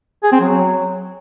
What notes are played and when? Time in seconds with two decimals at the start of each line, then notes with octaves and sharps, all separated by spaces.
0.23 G#4
0.32 C4
0.41 F#3